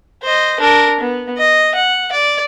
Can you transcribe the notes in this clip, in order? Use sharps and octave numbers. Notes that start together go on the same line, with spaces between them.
C5 D#5
D4 A#4
B3
D#5
F#5
D5